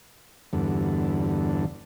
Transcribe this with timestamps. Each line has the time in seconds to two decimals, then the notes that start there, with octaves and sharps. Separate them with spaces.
0.53 E2 G2 D3